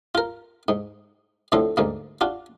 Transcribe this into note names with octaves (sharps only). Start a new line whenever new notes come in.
F4 A#4
G#2
F2 A2 D3 A4 C6
D2 G#2 A#3
D4 F4 F#4